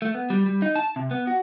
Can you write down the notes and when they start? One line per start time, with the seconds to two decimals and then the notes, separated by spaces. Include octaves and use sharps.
0.02 A3
0.15 B3
0.30 G3
0.46 G3
0.62 D#4
0.76 A5
0.96 C3
1.11 B3
1.27 F#4